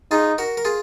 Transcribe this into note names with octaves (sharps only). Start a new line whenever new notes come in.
D#4 F4 G#4
F#4 A#4
A#4
F4 G#4